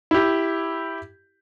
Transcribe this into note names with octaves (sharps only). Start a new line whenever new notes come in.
E4 G4